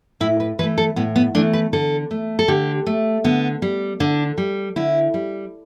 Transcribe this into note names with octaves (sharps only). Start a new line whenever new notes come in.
A2 E4
B4
E3 A3 B4
A4
A2 B3
B3
E3 A3 D4
B4
D3 A4
A3
A4
D3 G4
A3
D3 B3
G3
D3 D4
G3
D3 E4
G3